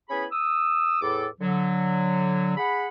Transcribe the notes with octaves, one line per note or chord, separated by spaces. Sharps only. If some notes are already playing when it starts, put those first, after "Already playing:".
B3 C#4 E4 G#4 G#5 B5
D#6 E6
E2 A2 A4 D6
D3 F#3
G#4 F#5 B5